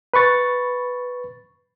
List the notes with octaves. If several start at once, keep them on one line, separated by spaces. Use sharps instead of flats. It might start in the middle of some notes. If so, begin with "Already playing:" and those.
B4 B5 C#6 A6